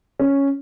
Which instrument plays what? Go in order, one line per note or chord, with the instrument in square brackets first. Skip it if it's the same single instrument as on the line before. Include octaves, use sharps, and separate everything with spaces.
[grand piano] C#4